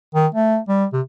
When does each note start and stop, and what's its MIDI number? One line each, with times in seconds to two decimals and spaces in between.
0.15 0.27 51
0.35 0.58 57
0.68 0.85 55
0.93 1.01 48